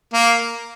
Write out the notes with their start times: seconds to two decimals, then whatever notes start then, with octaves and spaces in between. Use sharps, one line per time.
0.13 A#3